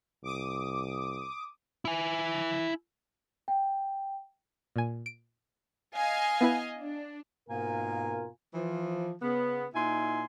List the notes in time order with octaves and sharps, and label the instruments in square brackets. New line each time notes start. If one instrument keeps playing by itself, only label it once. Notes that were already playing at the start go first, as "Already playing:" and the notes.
[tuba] C2 [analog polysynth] D6 D#6
[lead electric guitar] E4 G#5
[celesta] G5
[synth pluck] A#2 G#5
D7
[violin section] D#5 F5 G#5
[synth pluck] B3 E4 B4
[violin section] D4
[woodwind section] G#2 A#3 G#5 [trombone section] B2 F4 A#4
[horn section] E3 F3
C#3 B3
A#2 D#4 E4 G#5 C6